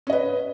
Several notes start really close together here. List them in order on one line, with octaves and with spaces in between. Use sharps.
C#4 D#5 B4